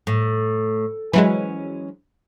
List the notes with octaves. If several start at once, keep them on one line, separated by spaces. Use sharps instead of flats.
A2
E3 F#3 G#3 C#4 E4 B4